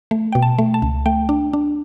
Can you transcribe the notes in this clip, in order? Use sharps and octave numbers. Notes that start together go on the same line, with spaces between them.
A3
B2 G5
A5
A3
A5
C#2
A3 G5
D4
D4